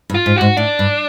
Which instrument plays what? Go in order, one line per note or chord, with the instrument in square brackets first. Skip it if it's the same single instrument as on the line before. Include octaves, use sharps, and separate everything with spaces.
[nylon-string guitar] G2
[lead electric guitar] F4
[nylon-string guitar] G#2
[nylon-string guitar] G#2 [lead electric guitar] F#4
[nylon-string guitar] A2 [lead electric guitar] D4
[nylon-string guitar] G2